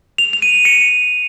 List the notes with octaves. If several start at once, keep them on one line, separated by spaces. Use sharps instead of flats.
F7
F7
D#7
C#7